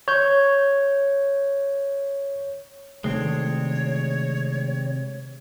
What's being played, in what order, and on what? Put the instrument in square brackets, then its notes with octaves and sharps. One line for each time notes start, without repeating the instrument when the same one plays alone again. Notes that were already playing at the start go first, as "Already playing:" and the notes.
[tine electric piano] C#5 G6
[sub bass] C3 [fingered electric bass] D#3 A3 [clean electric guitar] G#3 C4 D4 [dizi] C#5